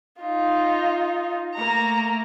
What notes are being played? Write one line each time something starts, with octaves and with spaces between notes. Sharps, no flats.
D#4 F4
A3 A#3 A#5